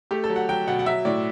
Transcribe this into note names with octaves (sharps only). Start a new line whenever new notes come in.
A3 G4
A4
F#3
F#5
F#3 G5
B2 F#5
F#5
F#3 E5
A2 D5